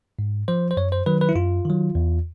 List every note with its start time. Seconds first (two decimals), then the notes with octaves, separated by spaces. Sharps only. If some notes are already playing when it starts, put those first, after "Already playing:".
0.19 G#2
0.48 F3 C5
0.71 C5
0.77 F#2 C#5
0.92 C5
1.06 D#3 F#3 B4
1.21 B4
1.29 E4
1.35 F#2 F4
1.65 D#3 F#3
1.95 E2